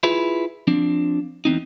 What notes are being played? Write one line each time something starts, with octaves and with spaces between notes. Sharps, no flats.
E4 F4 G#4 B4
F3 C4 D4
E2 C4 D#4